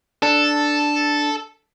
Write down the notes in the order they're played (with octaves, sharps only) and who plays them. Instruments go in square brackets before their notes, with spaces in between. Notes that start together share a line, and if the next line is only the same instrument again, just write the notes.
[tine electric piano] D4 [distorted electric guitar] A4